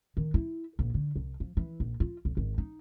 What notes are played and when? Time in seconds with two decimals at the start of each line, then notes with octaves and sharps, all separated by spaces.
0.17 D#3
0.34 E4
0.79 A#1
0.94 D3
1.16 C2
1.40 F3
1.57 E3
1.80 A#1
2.00 F4
2.25 B1
2.37 G#1
2.58 D#4